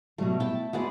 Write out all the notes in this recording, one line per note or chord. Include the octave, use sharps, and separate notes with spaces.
B2 F#3 G3 A3
E4 G5 A5
G#3 B3 F#4 D5